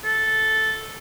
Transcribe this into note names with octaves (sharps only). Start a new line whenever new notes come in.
A4